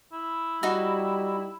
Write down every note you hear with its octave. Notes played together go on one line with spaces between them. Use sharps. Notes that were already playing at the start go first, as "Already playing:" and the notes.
E4
G3 D#4 F#4